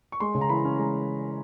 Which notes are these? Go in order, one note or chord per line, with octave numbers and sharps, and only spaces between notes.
C#6
G#3 C6
C#3
A#5
E3 B5
C#4
G#3 A#5